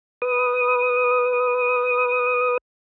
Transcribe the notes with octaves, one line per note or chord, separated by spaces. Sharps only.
B4 D#6